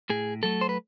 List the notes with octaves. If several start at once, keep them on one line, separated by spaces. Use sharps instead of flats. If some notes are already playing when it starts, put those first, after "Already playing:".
A2 G#4
F#3 A3 A4
C5
B4